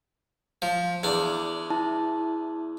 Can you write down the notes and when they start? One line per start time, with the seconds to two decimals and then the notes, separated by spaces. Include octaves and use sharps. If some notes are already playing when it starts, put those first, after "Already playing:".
0.62 F3
1.03 E2 D4
1.70 E4 A5